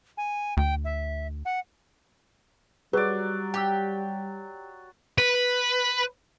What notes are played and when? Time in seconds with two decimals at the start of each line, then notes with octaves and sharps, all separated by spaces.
0.17 G#5
0.57 D2 G5
0.84 E5
1.45 F#5
2.93 F#3 G3 G#4 B4 D5
3.54 G4 G5 D6 E6
5.18 B4